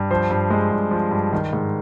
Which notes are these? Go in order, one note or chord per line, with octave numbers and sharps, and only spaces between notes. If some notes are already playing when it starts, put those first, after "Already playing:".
Already playing: G2
F3 C5
G2
G#3
G2
F3
G2
D#3
G#2